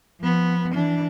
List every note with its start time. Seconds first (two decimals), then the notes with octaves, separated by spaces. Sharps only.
0.21 F3 B3
0.74 E3 D4